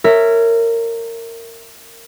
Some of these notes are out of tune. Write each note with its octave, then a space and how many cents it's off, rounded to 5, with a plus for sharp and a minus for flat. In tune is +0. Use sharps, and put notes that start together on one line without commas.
A#4 -20 C#5 +0 E5 +0